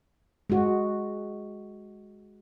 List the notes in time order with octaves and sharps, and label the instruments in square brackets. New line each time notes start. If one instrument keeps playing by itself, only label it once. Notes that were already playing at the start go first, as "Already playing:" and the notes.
[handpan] G#3 F#4